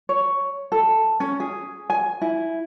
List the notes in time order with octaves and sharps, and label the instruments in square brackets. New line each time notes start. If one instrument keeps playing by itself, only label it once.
[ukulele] C#5
A4
C#4
G#4
G#5
E4